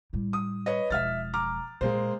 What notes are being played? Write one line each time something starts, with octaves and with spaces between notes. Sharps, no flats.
A2 G3
D#6
B4 C#5 D#5
E1 F3 E5 F6 A6
A#5 D6 F6
A#2 G#3 A#3 C5